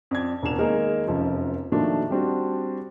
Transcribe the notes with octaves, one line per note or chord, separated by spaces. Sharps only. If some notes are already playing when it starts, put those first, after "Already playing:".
F2 D5 G#6
E1 F2 D4 A#4 E7 F7
D#3 G#3 A#3 D#4 G#4 A#4
F1 F#2 F3 D#4
A#2 D#3 F3 A3 D4 F#4
G3 C4 D4 F#4